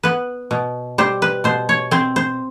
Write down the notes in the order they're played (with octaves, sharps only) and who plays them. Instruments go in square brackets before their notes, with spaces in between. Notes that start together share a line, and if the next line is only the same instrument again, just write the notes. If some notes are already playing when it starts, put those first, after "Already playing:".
[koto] B3 B4
B2
G3 C5
B4
B2 C5
C#5
C4 C5
C5